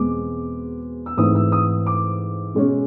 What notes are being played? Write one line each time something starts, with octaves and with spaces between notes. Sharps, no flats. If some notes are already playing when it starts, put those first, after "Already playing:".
Already playing: E2 B2 G#3 C4 D6
E6
G#2 E3 A3 C4 D#6
E6
D#6
D6
B2 G#3 C#4